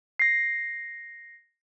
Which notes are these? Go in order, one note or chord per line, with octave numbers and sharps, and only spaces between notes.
A#6 C7